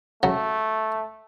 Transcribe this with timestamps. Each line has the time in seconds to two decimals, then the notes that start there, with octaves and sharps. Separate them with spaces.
0.23 C#3 F#3 A3